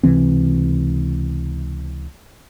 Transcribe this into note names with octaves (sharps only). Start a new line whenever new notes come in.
C#2 C3 E3 C4